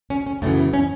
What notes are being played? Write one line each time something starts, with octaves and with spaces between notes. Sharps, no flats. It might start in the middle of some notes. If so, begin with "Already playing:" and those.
C#4
C#4
F#2 C#3 E3 A3
B3
C#4